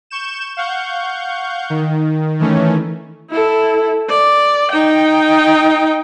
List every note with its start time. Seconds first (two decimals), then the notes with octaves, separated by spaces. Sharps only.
0.10 C#6 G6 E7
0.57 F5 F#5 C#6 G6
1.70 D#3
2.39 D#3 E3 A3 C#4
3.30 E4 A4
4.09 D5
4.71 D#4 G5